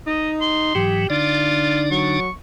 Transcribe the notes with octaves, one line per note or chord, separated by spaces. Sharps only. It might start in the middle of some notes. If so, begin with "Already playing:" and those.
D#4 D#5
C6
G#2 E3 F#3 G4
D3 D4 D#4 F4 D5
F#3 C#6